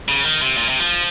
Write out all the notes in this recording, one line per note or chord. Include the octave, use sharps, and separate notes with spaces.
C#3
D#3
C3
A#2
C3
F3